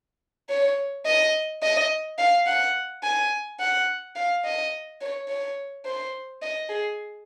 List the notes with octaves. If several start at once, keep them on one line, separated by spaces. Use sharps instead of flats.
C#5
D#5
D#5
F5
F#5
G#5
F#5
F5
D#5
C#5
C#5
C5
D#5
G#4